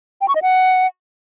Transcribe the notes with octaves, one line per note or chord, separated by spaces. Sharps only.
G5
C#6
D#5
F#5